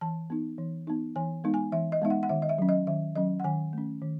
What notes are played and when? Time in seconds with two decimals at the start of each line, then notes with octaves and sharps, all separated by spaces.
0.01 E3 A5
0.30 B3 D#4
0.58 E3
0.87 B3 D#4
1.16 E3 G#5
1.44 G#3 B3 D#4
1.54 G#5
1.72 E3 E5
1.92 D#5
2.02 G#3 B3 D#4 E5
2.10 F#5
2.23 F#5
2.29 D#3 E5
2.42 D#5
2.49 E5
2.58 F#3 C#4
2.69 D#5
2.87 D#3 E5
3.16 F#3 C#4 D#5
3.40 F#5
3.44 D#3 G#5
3.73 A3 C#4
4.02 D#3